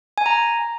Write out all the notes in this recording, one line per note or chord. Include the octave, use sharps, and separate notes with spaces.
G#5
A#5